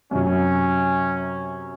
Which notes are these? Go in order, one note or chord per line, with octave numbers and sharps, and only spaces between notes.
F#2 C3 F#3 C#4